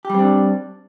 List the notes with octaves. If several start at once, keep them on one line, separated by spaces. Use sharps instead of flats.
G3 C4 D4 G4